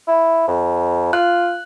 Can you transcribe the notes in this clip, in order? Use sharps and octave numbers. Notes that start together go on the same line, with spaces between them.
E4
F2
F4 F#6